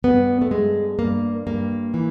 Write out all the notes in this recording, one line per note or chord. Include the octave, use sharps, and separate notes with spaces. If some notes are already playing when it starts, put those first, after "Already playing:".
G2 B3
A3
G2 G#3
G2 A#3
G2 A#3
E3